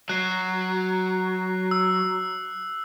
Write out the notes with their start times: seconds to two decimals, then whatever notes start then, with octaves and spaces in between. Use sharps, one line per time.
0.09 F#3 F#6 C7
1.71 E6